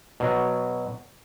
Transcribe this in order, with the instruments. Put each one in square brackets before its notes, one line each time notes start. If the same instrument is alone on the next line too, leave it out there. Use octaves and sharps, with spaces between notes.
[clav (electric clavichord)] B2 F#3